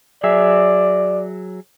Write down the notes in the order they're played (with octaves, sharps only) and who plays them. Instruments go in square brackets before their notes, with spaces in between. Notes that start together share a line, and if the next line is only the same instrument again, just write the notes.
[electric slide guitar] F#3 G#4 E5 [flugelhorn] D5